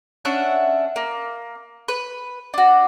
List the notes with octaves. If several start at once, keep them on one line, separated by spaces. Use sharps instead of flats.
C#4 D4 E5 F#5
A#3
B4
D4 F#4